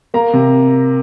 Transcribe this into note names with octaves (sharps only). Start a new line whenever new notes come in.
A#3 A#5
C3